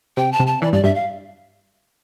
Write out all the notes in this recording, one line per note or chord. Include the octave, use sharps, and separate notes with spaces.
C3 G5
A5
C3
A5
E3 D5
G2 D5
G2 E5
F5